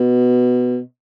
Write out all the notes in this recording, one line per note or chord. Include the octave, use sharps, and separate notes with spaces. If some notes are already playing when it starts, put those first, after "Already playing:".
Already playing: B2